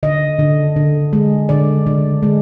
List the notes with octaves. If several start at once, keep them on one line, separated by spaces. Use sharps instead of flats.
D3 D#5
D3
D3
G#3
D3 D5
D3
G#3